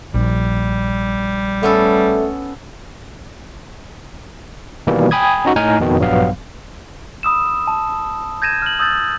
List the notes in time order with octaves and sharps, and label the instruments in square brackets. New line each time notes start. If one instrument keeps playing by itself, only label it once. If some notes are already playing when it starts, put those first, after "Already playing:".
[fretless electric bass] A#1 [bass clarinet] G3
[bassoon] A3 [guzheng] B3 C#4 A4
[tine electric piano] B2 D#3 E3 G3 A#3
G5 G#5 B5 D#6 G#6
C#4 D#4 F#4
A2 D#4 G#5 F6
F2 B2 D#3
A#1 G2 F#3 G3 B3 F5
[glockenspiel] B5 D#6 E6 E7
A5
G6 G#6 A#6 D#7 E7
F6 F#7
D#6 E6 G6 A6